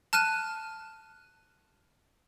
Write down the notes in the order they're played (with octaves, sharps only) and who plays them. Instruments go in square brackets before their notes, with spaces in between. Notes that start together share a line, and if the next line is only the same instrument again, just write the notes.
[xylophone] A5 F6 F#6 D#7